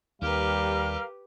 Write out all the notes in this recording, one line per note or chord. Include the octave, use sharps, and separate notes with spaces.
D#2 G3 G4 A#4 B4 F5 F6